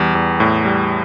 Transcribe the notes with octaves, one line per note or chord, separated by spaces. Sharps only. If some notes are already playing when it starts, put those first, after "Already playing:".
Already playing: E2 G3
E2
A2
G3